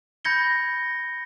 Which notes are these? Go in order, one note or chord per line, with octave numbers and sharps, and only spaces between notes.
B5 G6 G#6 A#6 C#7 G7